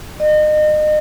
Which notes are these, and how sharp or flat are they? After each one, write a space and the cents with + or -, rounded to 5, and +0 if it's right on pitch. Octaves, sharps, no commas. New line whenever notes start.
D#5 -35